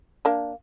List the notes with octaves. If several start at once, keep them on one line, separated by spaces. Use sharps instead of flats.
A#3 D4